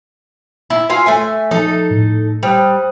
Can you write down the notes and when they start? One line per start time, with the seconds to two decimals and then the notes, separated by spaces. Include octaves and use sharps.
0.70 E4
0.90 F4 G#5
1.06 A3 E5 G#5
1.51 F3 D#4 A4
1.90 A2
2.43 G3 C5 D#6 F#6